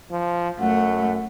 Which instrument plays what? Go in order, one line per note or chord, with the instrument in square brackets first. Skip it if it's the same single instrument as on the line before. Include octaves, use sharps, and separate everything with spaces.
[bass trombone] F3
[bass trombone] F#2 [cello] A3 [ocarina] F#5